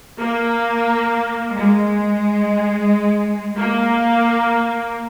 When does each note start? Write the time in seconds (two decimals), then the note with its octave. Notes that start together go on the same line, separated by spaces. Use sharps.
0.19 A#3
1.54 G#3
3.57 A#3